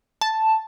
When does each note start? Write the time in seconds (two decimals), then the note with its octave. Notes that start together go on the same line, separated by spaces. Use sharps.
0.21 A5